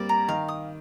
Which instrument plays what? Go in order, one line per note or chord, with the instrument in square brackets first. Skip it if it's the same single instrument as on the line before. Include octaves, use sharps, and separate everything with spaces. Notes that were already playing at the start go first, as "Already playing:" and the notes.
Already playing: [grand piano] G3 A#3 C4 [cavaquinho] D5
[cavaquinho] A#5
[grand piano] D#3 [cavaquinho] F5
[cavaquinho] D#6